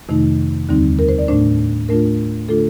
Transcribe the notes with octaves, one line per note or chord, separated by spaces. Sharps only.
F2 C3 D#3 A3 D#4
D#2 D3 G3 C4 D#4
A#4
C5
D5
A2 A3 D4 C5
A2 A3 D4 F4 A#4
D3 A3 D4 F4 A4